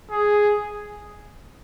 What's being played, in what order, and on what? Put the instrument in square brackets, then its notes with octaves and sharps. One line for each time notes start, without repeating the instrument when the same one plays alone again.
[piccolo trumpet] G#4